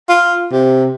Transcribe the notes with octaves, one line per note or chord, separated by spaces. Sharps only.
F4
C3